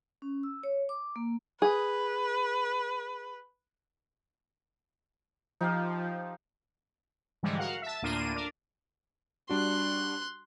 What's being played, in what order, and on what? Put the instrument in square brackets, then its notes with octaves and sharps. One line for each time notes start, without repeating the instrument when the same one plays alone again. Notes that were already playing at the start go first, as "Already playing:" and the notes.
[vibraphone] C#4
E6
C#5
D6
A#3
[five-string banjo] G#4 [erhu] B4
[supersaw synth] F3 [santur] D#4 G4 F5
[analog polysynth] G#2 D3 E3 F3 G3 G#3
F#4 A#4 F5 F#5
E5 A5
D2 A2 A#3 D4 F4 D#7
D4 A#4 D5
[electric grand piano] G3 D4 F#4 [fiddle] C6 F#6